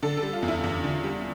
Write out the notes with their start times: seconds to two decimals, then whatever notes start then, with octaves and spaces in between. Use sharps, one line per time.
0.03 D3 A4
0.17 G3 A4
0.33 F4
0.42 E2
0.48 E4
0.64 E2
0.84 D3
1.04 G3